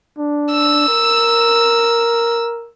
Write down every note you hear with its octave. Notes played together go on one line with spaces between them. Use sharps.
D4
E6
A#4